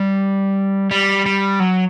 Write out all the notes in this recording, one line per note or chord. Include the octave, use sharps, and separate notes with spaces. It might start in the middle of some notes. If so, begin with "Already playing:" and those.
Already playing: G3
G3
G3
F#3